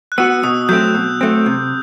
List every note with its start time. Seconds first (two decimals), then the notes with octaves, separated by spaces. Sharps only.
0.12 F#6
0.18 B3 F#4 E6
0.43 B2 D#6
0.69 F#3 A3 C4 G6
0.95 B2
1.21 F#3 A3 C4
1.46 C3